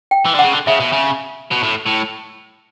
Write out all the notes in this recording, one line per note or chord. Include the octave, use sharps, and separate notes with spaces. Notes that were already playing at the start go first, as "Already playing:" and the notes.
G5
E3
D3
C#3 F#5
D3
C#3 E5
B2
C#3
B2
A2
A2